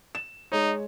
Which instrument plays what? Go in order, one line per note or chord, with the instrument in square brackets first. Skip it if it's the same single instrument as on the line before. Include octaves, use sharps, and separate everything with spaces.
[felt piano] E7
[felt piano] G#3 C#5 [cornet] D#4